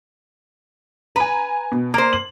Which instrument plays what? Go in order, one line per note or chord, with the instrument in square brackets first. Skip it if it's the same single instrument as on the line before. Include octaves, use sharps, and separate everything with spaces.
[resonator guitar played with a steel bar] B4 [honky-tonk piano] G#5 A#5
[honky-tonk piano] B2
[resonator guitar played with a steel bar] A#3 C5 [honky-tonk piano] A#5
[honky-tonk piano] F#7